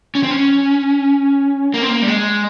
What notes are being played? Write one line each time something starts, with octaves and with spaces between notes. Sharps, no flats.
C#4
C4
C#4
A#3
C4
A#3
G3
G#3